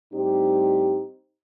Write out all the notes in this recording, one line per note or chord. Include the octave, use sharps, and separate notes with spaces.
A2 G3 C4 D#4 G4